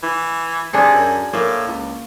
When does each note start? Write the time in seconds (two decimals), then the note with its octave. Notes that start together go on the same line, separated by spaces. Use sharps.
0.03 E3
0.73 C3 D4 G#4 A4
0.95 F#2
1.33 A2 A#3
1.68 C#2